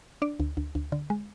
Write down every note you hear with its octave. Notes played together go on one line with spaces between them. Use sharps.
D4 D5
D2
D2
D2
D3
G#3